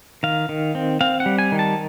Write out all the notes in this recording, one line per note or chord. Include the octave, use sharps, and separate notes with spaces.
D#3 F5
D#3
C4
C4 F5
F#5
G3
G#5
D#3
A5